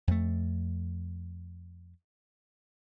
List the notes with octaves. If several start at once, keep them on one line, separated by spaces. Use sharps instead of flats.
F2 A3